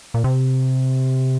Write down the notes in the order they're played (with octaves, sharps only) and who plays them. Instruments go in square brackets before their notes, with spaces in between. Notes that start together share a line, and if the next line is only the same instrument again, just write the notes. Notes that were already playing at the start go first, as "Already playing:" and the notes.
[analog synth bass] A#2
C3